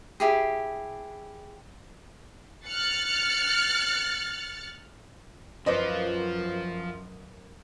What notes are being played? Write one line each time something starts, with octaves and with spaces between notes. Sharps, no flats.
E4 G4 G#4
F6 F#6 A6 C#7
F#2 F3 A#3 F4 B4 C5 D#5